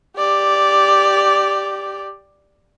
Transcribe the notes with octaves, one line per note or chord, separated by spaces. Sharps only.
G4 D5